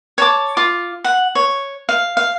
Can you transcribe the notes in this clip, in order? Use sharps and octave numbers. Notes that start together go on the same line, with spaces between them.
C#5 A5 D6
F4 D6
F#5
C#5
F5
F5